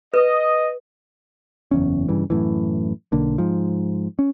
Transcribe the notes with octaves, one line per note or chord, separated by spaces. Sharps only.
B4 D#5
F#1 E2 C#4
G2 C#3 E3
F#2 A2 E3
B1 D3 A#3
G#2 F3
C#4